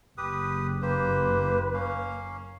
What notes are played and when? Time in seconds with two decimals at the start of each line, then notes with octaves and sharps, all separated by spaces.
0.18 F#1 G4 B4 D#6
0.82 A#3 G4 B4 C5
1.74 A#3 C#4 F5